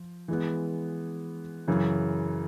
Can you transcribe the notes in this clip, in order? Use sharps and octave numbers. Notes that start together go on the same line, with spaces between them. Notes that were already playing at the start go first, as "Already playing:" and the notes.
Already playing: F3
E3 G#3 B3
F#2 C#3 E3